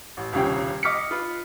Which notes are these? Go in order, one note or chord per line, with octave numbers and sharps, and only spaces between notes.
A1
D#1 C2 C#3 G5
D#5 D6 F6 B6 C#7
F4 B4